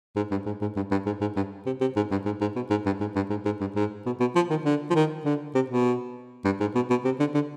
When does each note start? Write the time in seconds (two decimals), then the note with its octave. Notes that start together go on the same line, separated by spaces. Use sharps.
0.16 G#2
0.31 G2
0.46 G#2
0.61 G#2
0.76 G2
0.91 G2
1.06 G#2
1.21 G#2
1.36 G2
1.66 C3
1.81 C3
1.96 G#2
2.11 G2
2.25 G#2
2.41 G#2
2.56 B2
2.70 G#2
2.86 G2
3.00 G#2
3.16 G2
3.30 G#2
3.45 G#2
3.61 G2
3.76 G#2
4.06 B2
4.20 B2
4.36 F3
4.50 D#3
4.65 D3
4.90 F3
4.95 D#3
5.25 D3
5.55 C3
5.70 B2
6.45 G2
6.60 G#2
6.75 B2
6.90 B2
7.05 C3
7.19 D3
7.34 D3